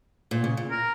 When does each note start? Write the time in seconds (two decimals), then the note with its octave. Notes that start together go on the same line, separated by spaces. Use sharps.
0.31 A#2
0.44 C#3
0.57 A#2
0.70 A#4